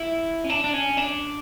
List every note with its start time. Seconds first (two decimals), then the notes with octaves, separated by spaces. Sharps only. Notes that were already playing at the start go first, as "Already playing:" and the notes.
Already playing: E4
0.44 C#4
0.50 D4
0.64 D4
0.74 C#4
0.97 D4